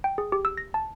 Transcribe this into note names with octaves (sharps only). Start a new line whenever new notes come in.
G5
G#4
G4
E6
A#6
A5